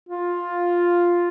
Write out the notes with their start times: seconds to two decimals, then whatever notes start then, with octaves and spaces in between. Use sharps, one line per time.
0.09 F4